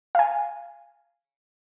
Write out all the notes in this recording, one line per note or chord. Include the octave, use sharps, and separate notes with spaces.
F5 G#5